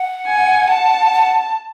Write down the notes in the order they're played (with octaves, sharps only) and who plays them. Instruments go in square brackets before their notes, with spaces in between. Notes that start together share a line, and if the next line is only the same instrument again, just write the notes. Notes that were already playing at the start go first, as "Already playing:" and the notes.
Already playing: [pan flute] F#5
[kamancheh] G#5
A5
[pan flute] F#5